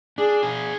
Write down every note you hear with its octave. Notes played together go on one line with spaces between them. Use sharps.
D4 G#4
G#4